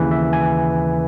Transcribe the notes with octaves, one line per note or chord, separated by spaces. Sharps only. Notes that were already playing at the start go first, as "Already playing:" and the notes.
Already playing: D#2 C#3 E3 B4
E5
G#5